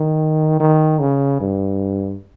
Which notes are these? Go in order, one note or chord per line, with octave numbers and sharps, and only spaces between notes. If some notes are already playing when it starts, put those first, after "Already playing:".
Already playing: D#3
D#3
C#3
G2